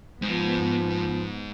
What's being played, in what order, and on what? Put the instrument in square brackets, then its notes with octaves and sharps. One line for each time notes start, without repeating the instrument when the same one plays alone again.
[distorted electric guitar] G#2 [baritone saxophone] F3 [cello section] B3